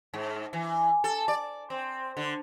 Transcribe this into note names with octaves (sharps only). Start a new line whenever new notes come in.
G#2
E3
A4
D5
C4
D3